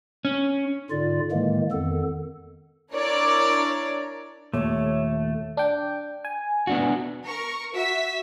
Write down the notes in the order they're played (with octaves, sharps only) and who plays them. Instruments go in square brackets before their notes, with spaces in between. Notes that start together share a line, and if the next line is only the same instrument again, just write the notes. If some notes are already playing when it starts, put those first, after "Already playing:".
[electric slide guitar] C#4
[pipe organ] G#2 D3 F4 D5
A2 D#3 E3 G#3 A#3
F2 D#3 B3 A4
[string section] D4 E4 A#4 C#5 D5
[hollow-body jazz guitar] D#2 A#2 [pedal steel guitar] A3 [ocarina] C#5
[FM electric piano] D4 G5
G#5
[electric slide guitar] B3 D4 F#4
[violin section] A#4 C#6
[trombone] F#4 [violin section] E5 E6 B6